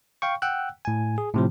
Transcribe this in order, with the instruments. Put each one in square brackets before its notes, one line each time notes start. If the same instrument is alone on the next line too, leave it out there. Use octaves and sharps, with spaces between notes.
[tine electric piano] F5 G5 C#6
F#5 G5 E6 F#6
A2 G#5
G#4
A2 C3 F3